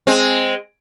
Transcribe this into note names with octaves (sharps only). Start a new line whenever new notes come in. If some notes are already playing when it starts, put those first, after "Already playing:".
G#3 C4